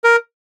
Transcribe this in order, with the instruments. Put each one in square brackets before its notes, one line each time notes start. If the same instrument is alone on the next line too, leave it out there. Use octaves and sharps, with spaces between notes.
[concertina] A#4